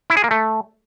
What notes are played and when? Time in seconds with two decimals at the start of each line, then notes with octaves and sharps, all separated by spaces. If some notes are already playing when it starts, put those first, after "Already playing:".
0.10 E4
0.17 G#4
0.24 A#3
0.31 A3